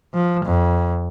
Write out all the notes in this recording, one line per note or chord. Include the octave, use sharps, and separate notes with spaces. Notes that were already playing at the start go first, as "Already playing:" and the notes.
F3
F2